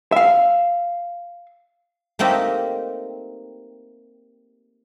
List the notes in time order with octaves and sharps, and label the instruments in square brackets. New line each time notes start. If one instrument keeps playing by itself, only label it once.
[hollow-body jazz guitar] E5 F5
[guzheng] A3 A#3 C4 D#4 G4